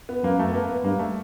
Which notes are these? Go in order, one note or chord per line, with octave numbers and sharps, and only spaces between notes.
B3
F#2 A#3
A3
B3
A#3
B3
G2 A#3
A3